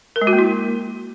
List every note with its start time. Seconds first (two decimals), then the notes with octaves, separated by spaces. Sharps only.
0.16 A#4
0.21 G#3
0.27 F#4
0.33 A#3
0.38 E4